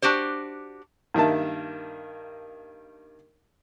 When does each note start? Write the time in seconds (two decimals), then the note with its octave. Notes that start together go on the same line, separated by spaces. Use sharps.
0.02 D4 F#4 G4 C5
1.14 G2 D#3 A#3 E5 A5